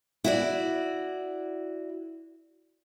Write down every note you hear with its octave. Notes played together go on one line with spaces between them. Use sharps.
E4 F#4 D5